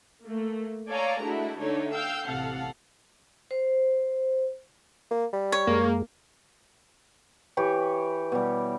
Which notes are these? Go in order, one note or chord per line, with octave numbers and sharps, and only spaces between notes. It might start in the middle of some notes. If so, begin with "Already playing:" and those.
A3 A#3
A4 C#5 D5 F5 G#5 A#5
G#3 A3 D4 E4 F#4
D3 A3 D4 D#4 C#5
F5 G5 E6 G6
A1 C3 A4 F5 F#5
C5
A#3
G3
C#5
F#2 G#3 A#3 G#4
E3 G4 B4 C#5
B2 G3